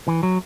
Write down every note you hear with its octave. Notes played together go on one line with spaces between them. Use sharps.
E3
F#3